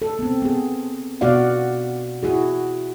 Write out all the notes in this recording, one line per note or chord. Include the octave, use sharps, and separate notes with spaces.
A4
B3 C4
B3 G#4
B2 B3 F#4 D5 F5 F#5
E4 F#4 G#4